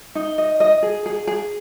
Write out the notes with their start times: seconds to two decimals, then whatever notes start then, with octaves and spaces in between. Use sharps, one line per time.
0.15 D#4
0.38 D#5
0.60 D#5
0.83 G#4
1.06 G#4
1.27 G#4